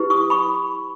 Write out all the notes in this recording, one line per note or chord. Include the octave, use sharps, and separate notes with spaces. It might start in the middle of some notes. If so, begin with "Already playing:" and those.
Already playing: E4 G4 B4
C#6 D#6
B5 C#6